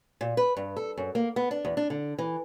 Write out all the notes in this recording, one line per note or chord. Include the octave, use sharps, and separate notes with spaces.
A#2
B4
G2
A4
F#2
A#3
B3
D4
E2
D4
D3
E3